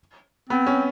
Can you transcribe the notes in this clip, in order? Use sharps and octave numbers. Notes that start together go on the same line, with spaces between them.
B3 C4
C#4